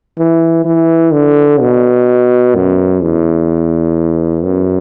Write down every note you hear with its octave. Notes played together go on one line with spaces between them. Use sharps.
E3
E3
D3
B2
F#2
E2
F#2